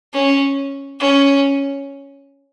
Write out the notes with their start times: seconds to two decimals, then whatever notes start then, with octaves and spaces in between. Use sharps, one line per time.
0.13 C#4
0.99 C#4